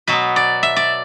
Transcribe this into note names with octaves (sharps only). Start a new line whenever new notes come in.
B2 F#3 B3 B4
D5
E5
D5